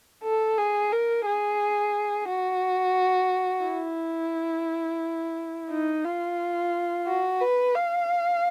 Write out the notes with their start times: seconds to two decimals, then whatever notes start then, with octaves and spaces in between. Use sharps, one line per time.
0.24 A4
0.58 G#4
0.92 A#4
1.26 G#4
2.29 F#4
3.65 E4
5.70 D#4
6.05 F4
7.07 F#4
7.41 B4
7.75 F5